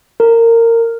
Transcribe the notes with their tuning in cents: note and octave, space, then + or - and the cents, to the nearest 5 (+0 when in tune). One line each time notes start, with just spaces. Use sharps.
A#4 -20